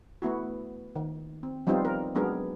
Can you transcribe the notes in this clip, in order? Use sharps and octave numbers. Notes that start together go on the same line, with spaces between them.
A3 B3 E4 F#4
D#3
C4
F3 G3 B3 C4 D#4 F4
A#4
F#3 G#3 B3 D4 G#4 A#4